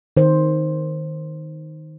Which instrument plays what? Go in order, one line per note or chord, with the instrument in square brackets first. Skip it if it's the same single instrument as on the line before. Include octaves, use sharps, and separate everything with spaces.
[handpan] D#3 C5